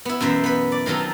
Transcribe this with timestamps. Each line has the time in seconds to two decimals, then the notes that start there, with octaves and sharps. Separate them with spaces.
0.05 B3 E4
0.20 F#2 B2 E3 C5 E5
0.44 B3 B4
0.72 D5
0.86 D#3 F#3 C4 F4 A4